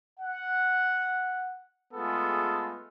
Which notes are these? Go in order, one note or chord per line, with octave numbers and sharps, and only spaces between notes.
F#5
G#3 A3 B3 F4 G#4 A4